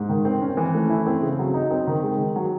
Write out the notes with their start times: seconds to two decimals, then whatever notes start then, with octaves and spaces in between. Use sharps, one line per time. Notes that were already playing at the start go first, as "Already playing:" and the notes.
Already playing: G#2
0.09 D#3
0.25 C4
0.42 C#4
0.57 E3
0.74 A3
0.89 E4
1.06 C4
1.22 C#3
1.39 F#3
1.54 D#4
1.71 C4
1.87 D#3
2.03 G#3
2.18 D#3
2.36 F#3